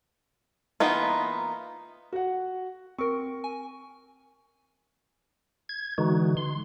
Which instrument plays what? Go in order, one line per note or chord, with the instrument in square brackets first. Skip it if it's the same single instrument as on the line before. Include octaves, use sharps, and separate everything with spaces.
[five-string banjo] E3 A#3 B3 D#4 F4
[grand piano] F#4 F#5
[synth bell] C4 A#4 [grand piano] C#6
[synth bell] G#5
[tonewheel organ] G#6
D3 E3 G#3 D#4 F#4
C6